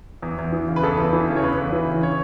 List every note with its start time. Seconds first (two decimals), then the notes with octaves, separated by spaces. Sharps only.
0.22 E2
0.38 E2
0.52 E3
0.68 C#3
0.76 B4
0.83 E2 A4
0.98 E2
1.13 E3
1.28 C#3
1.36 C#5
1.42 E2 B4
1.57 E2
1.72 E3
1.88 C#3
2.03 C#5